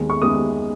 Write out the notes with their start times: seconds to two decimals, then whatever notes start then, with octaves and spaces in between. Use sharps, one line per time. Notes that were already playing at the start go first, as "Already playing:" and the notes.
Already playing: D#2 D#3 G#3 B3
0.10 C#6
0.22 D#2 D#3 G#3 B3 D#6